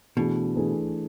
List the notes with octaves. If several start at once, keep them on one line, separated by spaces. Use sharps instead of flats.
B2 E3 A3 D4 G#4
E3 A3 D4 G#4